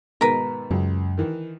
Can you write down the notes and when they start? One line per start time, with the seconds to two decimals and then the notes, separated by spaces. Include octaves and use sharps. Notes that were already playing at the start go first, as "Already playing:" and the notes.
0.21 G#2 B2 D#3 A#4 B4
0.71 C#2 F#2
1.17 D#3 E3